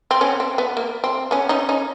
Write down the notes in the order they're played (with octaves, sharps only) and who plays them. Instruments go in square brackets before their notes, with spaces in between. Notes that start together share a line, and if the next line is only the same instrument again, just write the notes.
[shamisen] C4
B3 C#4
C4
B3
A#3
C4
B3 C#4
C#4 D#4
C#4 D#4